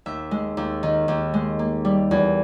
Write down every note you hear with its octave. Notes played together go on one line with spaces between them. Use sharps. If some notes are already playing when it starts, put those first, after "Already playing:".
D#2 E5
G#3
D#2
D#3
D#2
G#3
A#3
G3
E2